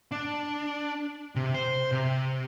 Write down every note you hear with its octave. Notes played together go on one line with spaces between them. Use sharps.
D4
C3
C5
C3